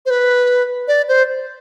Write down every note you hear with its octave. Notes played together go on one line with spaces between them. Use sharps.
C5
B4
D5
C5